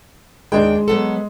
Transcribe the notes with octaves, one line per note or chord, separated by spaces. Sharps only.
D#2 G#3 D4 G5
F#3 B3 A4